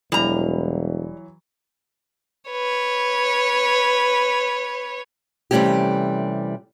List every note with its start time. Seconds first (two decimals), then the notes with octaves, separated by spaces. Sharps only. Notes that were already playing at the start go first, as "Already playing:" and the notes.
0.12 E1 E3 F#3 G3 A#5
2.51 B4 C#5
5.51 C3 E3 G3 A3 C#4 G4